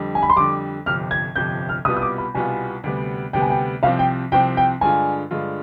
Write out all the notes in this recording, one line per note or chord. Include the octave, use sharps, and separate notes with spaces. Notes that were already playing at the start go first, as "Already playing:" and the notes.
Already playing: F2 D3 G3
G#5
B5
C6
F2 D3 G3 D6
G1 F2 C3 F3 F6
G#6
G1 F2 C3 F3 G6
F6
C2 B2 G3 B3 F4 D#6
D#6
D6
B5
C2 B2 G3 B3 F4 G#5
D2 C3 G3 B3
D2 C3 G3 B3 G5
G#5
G5
C2 C3 F3 C4 F5
G5
C2 C3 F3 C4 G5
G5
G2 D3 G#3 D4 F4 G#5
G2 D3 G#3 D4 F4